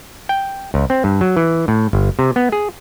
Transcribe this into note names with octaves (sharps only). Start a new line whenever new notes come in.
G5
C#2
C4
G2
F#3
E3
A2
G1
C3
B3
G#4